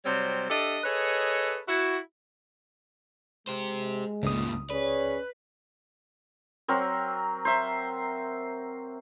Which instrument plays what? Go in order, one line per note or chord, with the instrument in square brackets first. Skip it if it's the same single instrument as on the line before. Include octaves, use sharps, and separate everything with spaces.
[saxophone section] C3 F#3 G3 C4 C#5
D4 G4 A4 D#5 E5
G#4 A4 B4 C#5 D#5
E4 F#4
[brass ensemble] G#3 [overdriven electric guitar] G4 C5
[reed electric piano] C#2 D#6 [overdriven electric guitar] G2 A#2
[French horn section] C#4 G#4 C#5 [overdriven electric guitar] B4 [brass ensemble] D5
[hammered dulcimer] F#3 C4 A#4
C5 E5